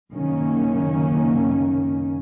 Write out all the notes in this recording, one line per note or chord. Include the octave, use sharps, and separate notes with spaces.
F#1 C2 F#2 D#3 A#3 C#4